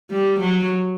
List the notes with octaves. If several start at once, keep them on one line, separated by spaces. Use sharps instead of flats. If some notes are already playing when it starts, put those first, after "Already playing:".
G3
F#3